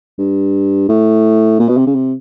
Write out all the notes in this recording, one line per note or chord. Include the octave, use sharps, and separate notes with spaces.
G2
A2
A#2
B2
C3
C#3
C3